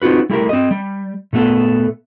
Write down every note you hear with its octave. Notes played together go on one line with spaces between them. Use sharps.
C4 D#4 F4 F#4 B4
G3 A3 E4 G4 A#4
C4 D#5
G3
A#2 A3 B3 A4